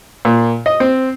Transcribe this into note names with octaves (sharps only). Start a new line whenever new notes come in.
A#2
D#5
C4